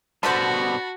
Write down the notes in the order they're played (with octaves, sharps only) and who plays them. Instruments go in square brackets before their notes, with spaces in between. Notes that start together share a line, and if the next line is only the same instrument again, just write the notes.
[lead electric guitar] B2 G3 [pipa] D3 C5 [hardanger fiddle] F#4 [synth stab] A5 B5